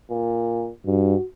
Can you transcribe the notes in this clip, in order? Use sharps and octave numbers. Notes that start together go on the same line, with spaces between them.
A#2
G2 F#4